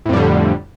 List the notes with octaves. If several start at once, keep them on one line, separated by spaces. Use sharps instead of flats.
F2 A2 D3 G3